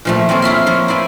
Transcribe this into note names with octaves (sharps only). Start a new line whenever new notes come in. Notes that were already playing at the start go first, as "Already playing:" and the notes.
A#2 F3 A3
F3 A#3 C4 G#4 C#5 D5
E4 F4 E5 F5
F3 A#3 C#5
E4 C5 D5 G#5